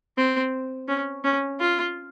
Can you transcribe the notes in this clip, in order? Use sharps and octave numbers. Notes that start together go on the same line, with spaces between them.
C4
C#4
C#4
F4